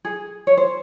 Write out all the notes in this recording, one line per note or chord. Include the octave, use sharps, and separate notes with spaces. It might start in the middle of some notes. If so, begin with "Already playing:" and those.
G#4
C#5
C5